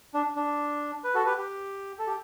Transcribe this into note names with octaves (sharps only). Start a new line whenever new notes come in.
D4
D4
B4
F#4 A4
G4 B4
G4
A4
G4